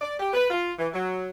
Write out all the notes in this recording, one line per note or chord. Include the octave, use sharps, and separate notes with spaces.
D5
G4
B4
F4
E3
F#3